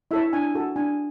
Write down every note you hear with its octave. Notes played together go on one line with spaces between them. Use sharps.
E4 A4 C#5 E5
D4 G#5
F#4 A4
D4 G#5